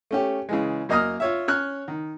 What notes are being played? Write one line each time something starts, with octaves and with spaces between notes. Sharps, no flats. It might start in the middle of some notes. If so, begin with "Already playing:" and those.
A3 C#4 G4
C#3 E3 G#3
F#2 A#3 D#5 A#5 D#6 F6
F4 C#5 E5
C#4 C#5 F6 F#6
D#3